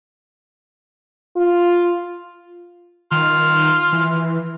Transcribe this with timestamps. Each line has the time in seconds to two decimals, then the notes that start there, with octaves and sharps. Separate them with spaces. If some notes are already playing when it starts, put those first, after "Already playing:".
1.36 F4
3.12 D#3 F4
3.93 E3